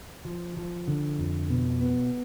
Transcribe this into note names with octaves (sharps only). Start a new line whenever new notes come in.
F3
F3
D3
F2
B2
B3